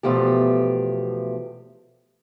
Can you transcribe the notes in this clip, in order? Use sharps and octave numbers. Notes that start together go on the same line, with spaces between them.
E2 B2 F3 A3 G4